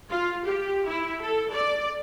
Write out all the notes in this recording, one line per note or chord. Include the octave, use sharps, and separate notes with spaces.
F4
G4
E4
A4
D5